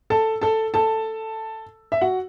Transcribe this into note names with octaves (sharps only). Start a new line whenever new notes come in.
A4 A5
A4 A5
A4 A5
E5
F#4 F#5